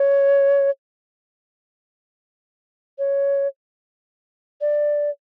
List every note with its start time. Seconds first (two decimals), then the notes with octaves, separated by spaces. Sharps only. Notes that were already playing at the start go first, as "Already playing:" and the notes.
Already playing: C#5
2.99 C#5
4.61 D5